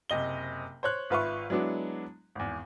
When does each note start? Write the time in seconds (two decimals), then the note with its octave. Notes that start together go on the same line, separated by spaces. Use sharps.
0.10 F#1 C3 D#5 G7
0.83 C5 C#5 F#6
1.10 G#1 F4 B4 E5 F5 C#6
1.50 F#3 G#3 B3 D4 E4
2.35 G#1 E2